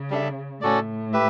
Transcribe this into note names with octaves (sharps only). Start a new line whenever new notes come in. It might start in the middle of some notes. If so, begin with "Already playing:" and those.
Already playing: C#3
G3 D4 A4 E5
A2 C#4 F#4 A4 D5
G4 B4 E5